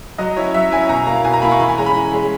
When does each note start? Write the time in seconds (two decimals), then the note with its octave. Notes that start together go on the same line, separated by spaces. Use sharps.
0.18 F#3 D#5
0.37 C#4 E4 C#5
0.54 F#3 E5
0.71 C#4 E4 G#5
0.89 B2 A#5
1.07 A#3 E4 A#5
1.25 B2 G#5
1.34 A#5
1.42 A#3 E4 B5
1.52 C#6
1.60 E3 B5
1.69 G#5
1.78 G#3 C#4 A#5
1.86 B5
1.96 E3
2.13 G#3 C#4